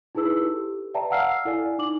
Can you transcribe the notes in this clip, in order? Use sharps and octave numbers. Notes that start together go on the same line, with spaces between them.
D#4 E4 G#4 B4 E6
G4 A4
B4 D5 E5 G5 A5 A#5
F5 F#5 E6 F6 C7
E4 A4 D5 G#5
D#4 D6 F#7